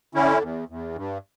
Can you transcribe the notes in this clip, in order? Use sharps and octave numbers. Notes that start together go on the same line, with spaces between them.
D3 C#4 E4
E2
E2
G2